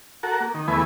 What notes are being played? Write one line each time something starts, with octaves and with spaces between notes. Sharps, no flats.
F#4 A4 A#4
A#3
D#3
E2 E3 A3 B3 B4 G#5